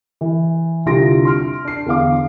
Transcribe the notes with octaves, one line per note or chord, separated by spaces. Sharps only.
E3
C2 D3 F4 C6 A#6 D7
C6 F6 D7
D4 C7
E2 D3 B3 F5 D6